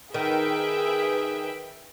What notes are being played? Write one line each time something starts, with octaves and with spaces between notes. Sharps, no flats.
D#3 G#4 B4 E5 G5